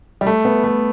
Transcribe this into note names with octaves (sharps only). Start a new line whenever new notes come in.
G3
A3
B3
A3